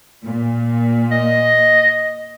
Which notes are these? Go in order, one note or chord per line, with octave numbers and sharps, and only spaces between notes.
A#2
D#5